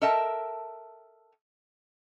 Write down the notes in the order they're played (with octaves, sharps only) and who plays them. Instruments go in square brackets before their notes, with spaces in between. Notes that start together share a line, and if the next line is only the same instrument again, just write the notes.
[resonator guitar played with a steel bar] A4 A#4 D#5 E5 G5 A5